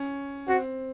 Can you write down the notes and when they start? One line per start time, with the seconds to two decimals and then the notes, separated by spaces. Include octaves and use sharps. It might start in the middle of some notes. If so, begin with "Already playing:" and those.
Already playing: C#4
0.48 C4 F#4